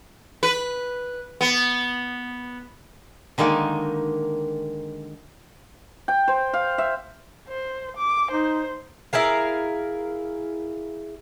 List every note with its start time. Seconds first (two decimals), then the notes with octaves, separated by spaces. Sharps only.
0.43 B4
1.41 B3
3.38 D3 D#3 G#3 A#3 D#4
6.08 G5
6.28 C5
6.53 F5
6.78 E5
7.48 C5
7.97 D6
8.31 D#4 C5
9.13 E4 G#4 A#4 F5